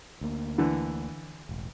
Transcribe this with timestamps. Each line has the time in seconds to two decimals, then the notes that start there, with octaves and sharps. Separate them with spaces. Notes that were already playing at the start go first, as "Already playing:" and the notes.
0.21 D2 A#3
0.58 D3 E3
1.49 E1 A1